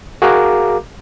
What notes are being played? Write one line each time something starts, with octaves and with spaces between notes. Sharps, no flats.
F#4 G#4 A#4 F5 A#5 D6